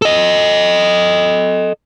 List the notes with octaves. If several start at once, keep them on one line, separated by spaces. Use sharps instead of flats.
A4 D#5